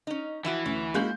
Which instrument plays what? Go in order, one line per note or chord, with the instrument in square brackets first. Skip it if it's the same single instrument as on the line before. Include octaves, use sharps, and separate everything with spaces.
[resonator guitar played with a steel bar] C#4 D#4
[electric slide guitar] E3 [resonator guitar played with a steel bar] F3 E4 F#4
[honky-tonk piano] D2 [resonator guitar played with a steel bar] C#4
[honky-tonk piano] G#3 A#3 G6 [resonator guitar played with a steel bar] C#4 E4 F#4